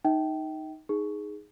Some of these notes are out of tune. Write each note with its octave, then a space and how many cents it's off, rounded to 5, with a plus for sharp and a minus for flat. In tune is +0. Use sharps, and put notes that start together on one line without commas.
D#4 +0 E5 -45 G5 -20
D#4 +0 G#4 +0